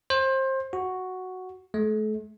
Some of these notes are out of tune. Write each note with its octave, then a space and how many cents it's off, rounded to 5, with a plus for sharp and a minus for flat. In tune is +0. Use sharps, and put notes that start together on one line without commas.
C5 +25
F#4 +0
A3 -40